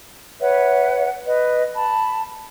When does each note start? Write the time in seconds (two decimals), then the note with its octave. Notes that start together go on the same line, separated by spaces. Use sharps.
0.40 B4 C#5 E5 F#5
1.26 B4 D#5
1.75 A5 B5